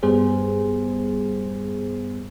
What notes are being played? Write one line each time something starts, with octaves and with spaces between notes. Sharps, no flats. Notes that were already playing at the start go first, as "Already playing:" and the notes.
G2 G3 B3 G#4 C5